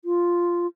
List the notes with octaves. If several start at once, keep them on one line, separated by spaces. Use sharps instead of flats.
F4